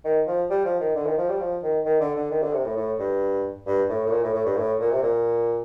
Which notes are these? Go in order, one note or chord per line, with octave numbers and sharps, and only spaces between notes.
D#3
F3
G3
F3
D#3
D3
D#3
F3
G3
F3
D#3
D#3
D3
D3
D#3
D3
C3
A2
A2
G2
G2
A2
A2
A#2
A2
A2
G2
A2
A#2
C3
A#2